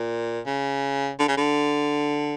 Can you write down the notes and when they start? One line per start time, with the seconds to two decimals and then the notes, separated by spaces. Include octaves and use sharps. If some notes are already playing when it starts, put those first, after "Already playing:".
Already playing: A#2
0.46 C#3
1.19 D3
1.28 C#3
1.37 D3